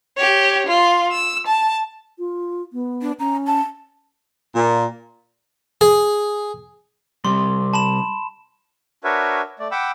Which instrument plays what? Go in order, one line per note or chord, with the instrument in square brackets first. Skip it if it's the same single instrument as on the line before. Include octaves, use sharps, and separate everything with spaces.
[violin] G4 C#5
F4
E6
A5
[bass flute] F4
B3
[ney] D4
[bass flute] C#4 [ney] A#5
[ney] A5
[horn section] A#2
[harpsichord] G#4
[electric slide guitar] C3 G3 [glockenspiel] C6
[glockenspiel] A5 B5 E7
[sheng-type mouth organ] D4 F#4 A#4 B4 C#5 E5
A3 D5
F#5 G5 B5 D6 E6